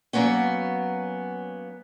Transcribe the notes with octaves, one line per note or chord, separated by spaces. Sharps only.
F#3 G#3 A#3 B3 C#4